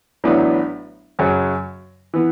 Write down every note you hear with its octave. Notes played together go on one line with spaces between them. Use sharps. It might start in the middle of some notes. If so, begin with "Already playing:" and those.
A1 A2 F#3 B3 D4
F#2 C#3 F#3
E3 B3